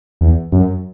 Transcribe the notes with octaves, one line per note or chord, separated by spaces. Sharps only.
E2
F#2